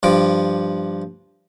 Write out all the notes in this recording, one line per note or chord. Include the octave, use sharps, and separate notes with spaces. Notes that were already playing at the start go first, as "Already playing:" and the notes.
G2 F3 D6